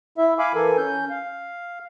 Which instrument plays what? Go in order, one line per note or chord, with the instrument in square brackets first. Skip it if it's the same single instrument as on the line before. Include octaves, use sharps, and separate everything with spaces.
[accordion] E4 E5
F5 G#5 B5 D6
E3 A4 A#4 G#5
C#4 G6
F5